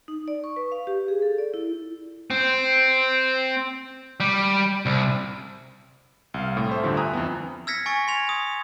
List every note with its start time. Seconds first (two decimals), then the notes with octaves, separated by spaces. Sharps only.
0.08 D#4
0.28 D5
0.44 C#6
0.56 B4
0.72 F5
0.87 G4
1.08 G#4
1.22 A4
1.38 D5
1.54 E4
2.30 C4
4.20 G3
4.86 C2
6.34 C2 F5
6.57 A2
6.70 A4 C5 E5
6.83 D2 G2 D3 F3
6.97 E5 G5 G#5 A#5 D#6 F#6
7.13 F2 E3 B3
7.67 E6 F6 G#6 A#6 B6 C#7
7.86 G#5 C#6 A6
8.08 C6 G#6 F7
8.29 D#6